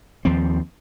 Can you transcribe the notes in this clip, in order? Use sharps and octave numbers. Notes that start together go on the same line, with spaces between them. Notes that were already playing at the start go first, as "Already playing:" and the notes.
D#2 F3 C4